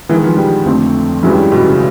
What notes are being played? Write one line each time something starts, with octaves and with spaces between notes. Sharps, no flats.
D#3 E3 G#3 B3
F3
G3
F2 D3 F3 A3 C4
G2 E3 F#3 G#3 C#4 E4
G3
B2
C#3